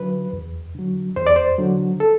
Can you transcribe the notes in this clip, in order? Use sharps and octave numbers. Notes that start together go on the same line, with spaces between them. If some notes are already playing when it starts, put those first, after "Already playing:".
Already playing: D3 F#3 B4
E2
D3 F#3
E2 C5
D5
C5
D3 F#3
A4